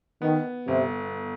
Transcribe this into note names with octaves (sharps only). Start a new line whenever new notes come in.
D#3 B3
G1 C3